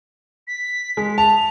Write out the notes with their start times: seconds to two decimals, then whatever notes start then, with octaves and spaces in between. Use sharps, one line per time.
0.47 B6
0.97 G#3
1.18 A5 F7
1.34 F7